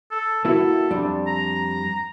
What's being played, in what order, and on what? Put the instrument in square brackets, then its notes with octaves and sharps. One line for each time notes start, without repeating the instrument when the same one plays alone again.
[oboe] A4
[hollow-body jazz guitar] A#3 E4 F#4 [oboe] A4
[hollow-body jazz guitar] F2 G3 D4
[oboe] A#5